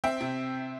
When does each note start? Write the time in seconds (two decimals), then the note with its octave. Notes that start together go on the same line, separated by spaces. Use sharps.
0.04 C4 E5 G5
0.21 C3